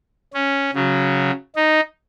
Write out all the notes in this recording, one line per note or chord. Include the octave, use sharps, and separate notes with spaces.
C#4
C#3 F#3
D#4